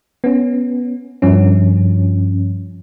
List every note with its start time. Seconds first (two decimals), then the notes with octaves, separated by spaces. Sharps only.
0.24 B3 C#4
1.22 G2 F3 C#4